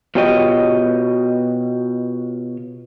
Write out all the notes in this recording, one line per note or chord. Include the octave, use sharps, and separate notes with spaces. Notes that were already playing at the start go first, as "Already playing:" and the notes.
B2 F4 G4 C#5 D#5